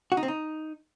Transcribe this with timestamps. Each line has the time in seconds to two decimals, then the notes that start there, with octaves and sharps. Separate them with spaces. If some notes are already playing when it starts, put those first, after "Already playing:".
0.12 F#4
0.17 D#4
0.23 C4
0.28 D#4